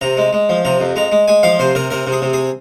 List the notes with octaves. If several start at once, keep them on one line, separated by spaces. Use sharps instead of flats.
C3 A#5
G#3
G#3
F3
C3 A#5
F2
G#3 A#5
G#3
G#3 G#5
F3 F5
C3 C5
C3 A#4
C3 A#4
C3
G#4
C3
G#4